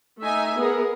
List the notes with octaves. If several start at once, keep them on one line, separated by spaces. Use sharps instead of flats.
A3 D#4 E5 G#5
B3 G#4 A#4